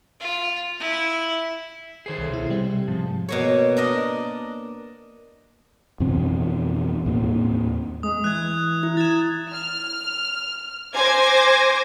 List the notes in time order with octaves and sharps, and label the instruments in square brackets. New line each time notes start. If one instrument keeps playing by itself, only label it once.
[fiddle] F4
E4
[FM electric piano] D#3 C7 [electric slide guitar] G#4 C5 C#5
[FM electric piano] C2 A4
B2 E4
C3 G3 C4
[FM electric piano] G#2 C3 G#3 [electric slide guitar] F3
[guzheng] B2 A#3 C#5
D4 A#4 D#5
[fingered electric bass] F2 B2 E3 C4
D#2 A2 A#3
[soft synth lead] G#3 [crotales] D#6
[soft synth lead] E3 [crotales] F#6 G#6
[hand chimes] E4
[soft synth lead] G#6 [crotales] A6 E7
[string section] F6
C5 G#5 D6 G#6 A#6